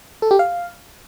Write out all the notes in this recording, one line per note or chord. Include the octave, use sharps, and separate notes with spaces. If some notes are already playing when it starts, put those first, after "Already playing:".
A4
G4
F5